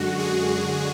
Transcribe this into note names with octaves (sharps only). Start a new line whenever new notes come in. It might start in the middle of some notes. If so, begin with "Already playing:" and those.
Already playing: F#2 D3 G#3 F#4
G#4